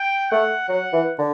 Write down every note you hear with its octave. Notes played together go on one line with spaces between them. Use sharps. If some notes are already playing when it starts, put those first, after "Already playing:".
Already playing: G5
A3 F#5
F#3 F#5
E3
D3